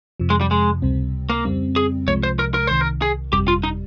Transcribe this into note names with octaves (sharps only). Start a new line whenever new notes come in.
F2 C3 F3
G#3
G3
G#3
C#2 C3 G3 C4
A#3
F2 C#3 G3 C4
G#4
C2 C3 F3 G#3 C#5
C5
A#4
A#4
C2 C3 D#3 C5
A#4
G#4
G1 F2 C3 G3 G4
F4
D#4